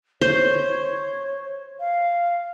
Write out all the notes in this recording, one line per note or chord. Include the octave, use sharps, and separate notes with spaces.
C5 C#5
F5